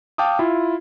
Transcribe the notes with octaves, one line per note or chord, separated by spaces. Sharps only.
F5 G5 A5 D6 D#6
E4 F4